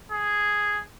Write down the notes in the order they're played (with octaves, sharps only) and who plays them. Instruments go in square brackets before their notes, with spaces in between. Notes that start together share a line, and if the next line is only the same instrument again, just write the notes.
[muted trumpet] G#4